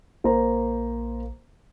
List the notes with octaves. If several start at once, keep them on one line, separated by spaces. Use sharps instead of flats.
A#1 A#3 C5 A#5